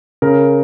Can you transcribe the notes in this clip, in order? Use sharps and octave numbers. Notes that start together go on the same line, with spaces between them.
C#3 A#4